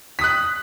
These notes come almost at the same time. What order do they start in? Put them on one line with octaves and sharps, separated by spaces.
B6 D#6 F#6